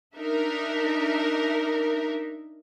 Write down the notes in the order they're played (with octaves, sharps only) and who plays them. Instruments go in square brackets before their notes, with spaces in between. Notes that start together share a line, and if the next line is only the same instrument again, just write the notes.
[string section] D4 D#4 A#4 E5